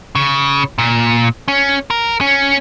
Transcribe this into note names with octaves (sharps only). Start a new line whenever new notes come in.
C#3
A#2
C#4
A#4
C#4